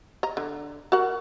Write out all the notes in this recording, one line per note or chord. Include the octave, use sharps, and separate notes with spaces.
D#5 A#5
D3
F#4 A#4 F#5